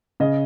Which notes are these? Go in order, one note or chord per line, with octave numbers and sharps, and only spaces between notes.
C#3 D#5